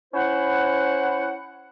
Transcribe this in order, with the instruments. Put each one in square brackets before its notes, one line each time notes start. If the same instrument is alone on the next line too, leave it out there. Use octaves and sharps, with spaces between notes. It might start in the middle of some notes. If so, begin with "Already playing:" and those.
[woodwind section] C#4 E4 C5 F#5